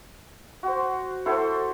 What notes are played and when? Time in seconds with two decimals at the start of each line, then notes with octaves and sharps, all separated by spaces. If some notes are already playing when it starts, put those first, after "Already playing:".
0.63 F#4 C5
1.26 E4 F#4 A4 C5